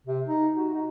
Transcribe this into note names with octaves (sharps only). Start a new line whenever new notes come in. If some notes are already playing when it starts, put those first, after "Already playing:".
C3
D#4
F#4
D#4